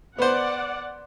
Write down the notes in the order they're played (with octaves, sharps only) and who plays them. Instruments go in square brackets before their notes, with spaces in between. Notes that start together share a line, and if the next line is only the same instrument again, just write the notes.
[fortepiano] B3 C5 [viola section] D5 F#5